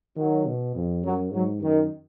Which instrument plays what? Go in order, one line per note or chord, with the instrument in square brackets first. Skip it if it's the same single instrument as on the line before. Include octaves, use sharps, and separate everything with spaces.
[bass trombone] D#3 [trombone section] F#3
[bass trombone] B2
F2
[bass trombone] F#2 [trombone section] F#3
[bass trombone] G#2 [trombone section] F#3
[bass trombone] F#2 [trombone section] D#3